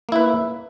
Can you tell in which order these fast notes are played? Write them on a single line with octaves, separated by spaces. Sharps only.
A#3 E4 B4